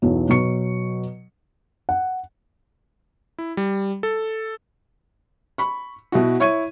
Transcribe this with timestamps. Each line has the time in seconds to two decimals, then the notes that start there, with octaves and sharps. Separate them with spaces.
0.02 B1 E2 F#3
0.29 B2 F#3 F#4 C#6 C#7
1.89 F#5
3.39 E4
3.57 G3
4.03 A4
5.58 B5 C#6
6.12 B2 E4 F#4
6.40 E4 C#5 C#6 G#6 D#7